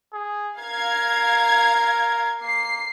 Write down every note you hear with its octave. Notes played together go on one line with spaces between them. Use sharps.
G#4
A#4 F5 G#6
A#3 C7